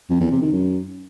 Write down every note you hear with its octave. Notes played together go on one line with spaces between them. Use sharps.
F2
E2
C3
D#3
F#2